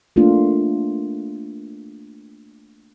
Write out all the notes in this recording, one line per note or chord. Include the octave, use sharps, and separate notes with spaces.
A3 A#3 D4 F4